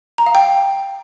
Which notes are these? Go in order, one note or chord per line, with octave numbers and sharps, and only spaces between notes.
A#5
F5
G5